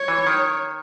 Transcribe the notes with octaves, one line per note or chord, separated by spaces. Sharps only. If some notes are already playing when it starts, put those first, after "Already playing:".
Already playing: C#5
E3
D#3